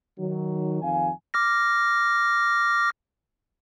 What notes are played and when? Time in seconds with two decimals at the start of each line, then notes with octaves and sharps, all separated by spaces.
0.18 D#3 F#3
0.82 F2 D#3 F5 G#5
1.34 D6 F6 A#6